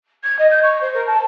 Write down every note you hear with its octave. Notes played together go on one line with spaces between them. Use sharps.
G#6
D#5
G6
C#6
C5
A#4
A5